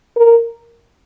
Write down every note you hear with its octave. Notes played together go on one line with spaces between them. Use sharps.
A#4